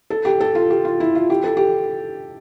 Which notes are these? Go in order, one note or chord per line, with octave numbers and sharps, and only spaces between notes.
A4
G4
A4
F4
G4
F4
E4
F4
G4
A4
G4